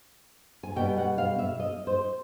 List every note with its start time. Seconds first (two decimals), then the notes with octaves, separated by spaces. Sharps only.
0.63 G#5
0.76 B2 G3 B3 G5
0.98 F#5
1.18 F5
1.38 E5
1.60 D#5
1.87 C5